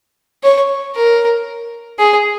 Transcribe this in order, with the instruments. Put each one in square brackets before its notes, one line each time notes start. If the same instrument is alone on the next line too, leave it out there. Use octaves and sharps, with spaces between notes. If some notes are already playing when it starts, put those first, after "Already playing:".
[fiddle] C#5
A#4
G#4